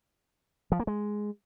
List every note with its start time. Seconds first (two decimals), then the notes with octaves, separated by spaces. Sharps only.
0.72 F3
0.79 A#3
0.87 G#3